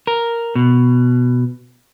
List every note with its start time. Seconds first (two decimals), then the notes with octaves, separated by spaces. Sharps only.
0.07 A#4
0.55 B2